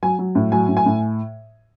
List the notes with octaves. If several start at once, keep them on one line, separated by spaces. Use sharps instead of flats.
F#3 G#5
F#3
A2
F#3 G#5
A2
G#5
A2